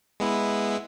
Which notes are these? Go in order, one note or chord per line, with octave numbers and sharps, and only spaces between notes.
G#3 B3 E4